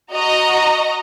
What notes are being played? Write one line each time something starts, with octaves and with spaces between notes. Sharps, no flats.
F#4 D#5 A#5